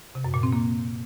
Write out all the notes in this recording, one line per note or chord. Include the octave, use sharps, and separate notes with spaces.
C3
F#2
A#2
C4
A#3